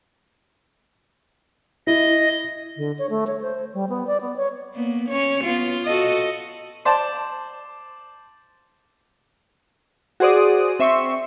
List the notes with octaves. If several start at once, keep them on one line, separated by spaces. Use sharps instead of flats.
E4 D#5
D3
C#5
A3
C#5
C5
G3
B3
D5
B3
C#5
A#3 B3
C#4 C#5
B3 F4
F#4 A4 D#5
C5 D5 A5
F#4 G#4 C5 D5 D#6
C4 E5 C6 C#6